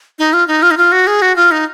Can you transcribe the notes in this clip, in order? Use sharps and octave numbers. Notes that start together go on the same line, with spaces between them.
D#4
F4
D#4
F4
D#4
F4
F#4
G#4
F#4
F4
D#4